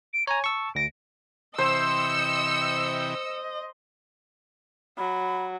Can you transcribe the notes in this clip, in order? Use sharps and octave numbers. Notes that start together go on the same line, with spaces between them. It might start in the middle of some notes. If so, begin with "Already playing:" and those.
D7
C#5 G#5 A#5
A5 C#6 E6
D2 A#6 D7
C3 E3 C5 D#5 G5 E6 C#7
F#3 B5